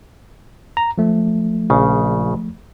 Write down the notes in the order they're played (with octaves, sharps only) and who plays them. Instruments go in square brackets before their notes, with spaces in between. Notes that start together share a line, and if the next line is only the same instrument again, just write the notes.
[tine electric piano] A#5
F3 A3
[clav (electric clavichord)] A#1 C#3